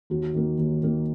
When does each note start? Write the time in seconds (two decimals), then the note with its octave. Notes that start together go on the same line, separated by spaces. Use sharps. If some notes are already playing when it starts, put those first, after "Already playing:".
0.10 D#2 F#4
0.34 D#3 A#3
0.58 D#2
0.82 D#3 A#3